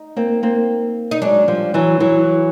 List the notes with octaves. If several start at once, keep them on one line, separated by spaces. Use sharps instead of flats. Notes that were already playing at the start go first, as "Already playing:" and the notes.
Already playing: D#4
A#3 C4
A#3 C4
D#4
F#3 G#3 D4
F3 G3
E3 F#3
E3 F#3